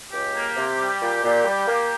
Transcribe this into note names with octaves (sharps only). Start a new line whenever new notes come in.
C#2 G4
A#3
C3
G3
A#2
A#2
G3
A#3